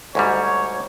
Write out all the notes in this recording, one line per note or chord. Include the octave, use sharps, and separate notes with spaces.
D2 G#2 G3 C#5